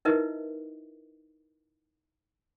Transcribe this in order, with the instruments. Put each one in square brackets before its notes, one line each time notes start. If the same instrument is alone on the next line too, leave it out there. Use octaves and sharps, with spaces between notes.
[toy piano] D#4 E4 A#4 B4 D#5 E5